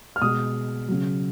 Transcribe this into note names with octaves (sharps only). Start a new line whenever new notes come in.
F6
B2 G#3 D#6
C#3 F#3